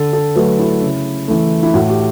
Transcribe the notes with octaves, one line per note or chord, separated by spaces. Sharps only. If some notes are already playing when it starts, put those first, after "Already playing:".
Already playing: D3 A4
A4
F#3 A3 B4
E4
C#3
E3 A3
E4
A2 F#4
G4